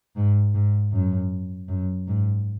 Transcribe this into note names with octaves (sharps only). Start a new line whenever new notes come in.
G#2
G#2
F#2
F#2
G#2